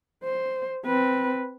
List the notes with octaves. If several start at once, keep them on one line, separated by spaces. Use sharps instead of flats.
C5
C4 B4